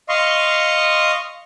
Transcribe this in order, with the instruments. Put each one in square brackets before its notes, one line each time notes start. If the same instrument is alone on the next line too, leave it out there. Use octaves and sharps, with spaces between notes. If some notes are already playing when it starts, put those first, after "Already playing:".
[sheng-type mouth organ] D#5 F5 C6 C#6